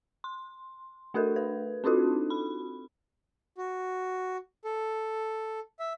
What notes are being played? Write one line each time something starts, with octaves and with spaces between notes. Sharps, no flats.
C6
A3 D4 F#4 A4 A#4
B4
C4 D4 D#4 F4 F#4 A4
B5
F#4
A4
E5